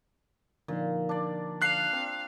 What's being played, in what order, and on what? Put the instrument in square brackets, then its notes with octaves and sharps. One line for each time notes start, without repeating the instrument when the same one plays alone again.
[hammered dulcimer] A#2 [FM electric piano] D3 F3 D#4
[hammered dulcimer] D4 D5
[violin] F5 [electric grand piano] F#6 C7
[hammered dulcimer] C4